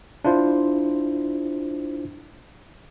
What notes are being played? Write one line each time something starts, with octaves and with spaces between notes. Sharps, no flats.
D4 E4 F4 C5